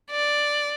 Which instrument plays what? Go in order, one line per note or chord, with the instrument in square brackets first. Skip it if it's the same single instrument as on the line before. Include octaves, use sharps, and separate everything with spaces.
[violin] D5